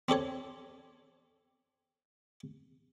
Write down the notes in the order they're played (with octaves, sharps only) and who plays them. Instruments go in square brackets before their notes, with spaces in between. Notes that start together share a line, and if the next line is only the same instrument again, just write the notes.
[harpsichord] C4 D4 A4 C#5